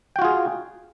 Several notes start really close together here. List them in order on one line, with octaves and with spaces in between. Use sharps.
G5 F#4 F4 G#4